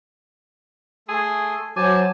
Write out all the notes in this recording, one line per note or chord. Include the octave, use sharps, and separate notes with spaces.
A3 G#4 A4 C6
F#3 C5 G#5 A5 D6